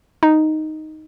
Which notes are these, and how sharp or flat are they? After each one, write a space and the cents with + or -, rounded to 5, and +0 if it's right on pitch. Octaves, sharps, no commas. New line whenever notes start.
D#4 +0